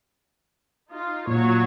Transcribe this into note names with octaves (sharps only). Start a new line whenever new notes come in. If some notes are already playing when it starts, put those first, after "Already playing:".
D#4 F4
A#2 F#3 C#5